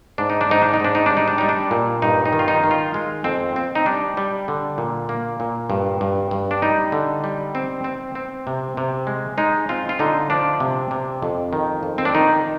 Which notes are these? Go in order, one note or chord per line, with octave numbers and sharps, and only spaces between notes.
G#2 D4
D#4
D4
G#2 D#4
D4
D#4
G#2 D4
D#4
G3 D4
D#4
D4
G3 D#4
D4
A#2
G2 D#4
D#4
D#3
F4
D#4
D#3
F4
G#3
F2 C4
C4
D#4
G3 D4
G3
D3
A#2
A#3
A#2
G2
G2
G2
D4
G3 D#4
D3
G3
C4
C4
C4
C3
C3
G#3
G#3 D#4
C4 F4
F4
D3 D#4
F3 D4
C3
C3
F2
D#3
F2
C4
D4
D#3 D#4